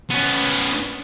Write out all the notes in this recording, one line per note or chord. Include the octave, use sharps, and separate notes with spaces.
B3 C#4